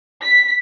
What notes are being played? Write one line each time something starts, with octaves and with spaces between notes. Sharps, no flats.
B6